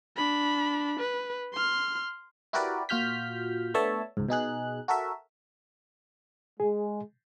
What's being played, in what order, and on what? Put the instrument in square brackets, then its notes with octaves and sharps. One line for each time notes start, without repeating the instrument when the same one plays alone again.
[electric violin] D4 B5
B4
C6 F6
[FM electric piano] E4 F#4 G4 A#4 B4 D5
A#2 F4 F#4 F6 G6 B6
A3 B3 D4 C#5 E5 A5
C#2 G#2
B2 D#4 G#4 F#6
F#4 A4 A#4 E5
[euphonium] G#3 [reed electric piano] G#4